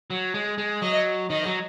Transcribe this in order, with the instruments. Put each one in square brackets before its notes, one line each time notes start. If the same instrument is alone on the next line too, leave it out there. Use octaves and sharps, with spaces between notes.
[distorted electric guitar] F#3
G#3
G#3
[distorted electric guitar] F#3 [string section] D#5
[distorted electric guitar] D#3 [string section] D#5
[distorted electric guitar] F#3